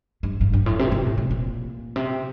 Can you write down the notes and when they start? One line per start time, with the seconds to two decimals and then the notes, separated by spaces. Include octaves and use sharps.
0.23 G2
0.41 G2
0.53 G2
0.66 A2
0.79 C3
0.87 A#2
0.92 C3
1.05 A2
1.17 A2
1.31 A#2
1.96 C3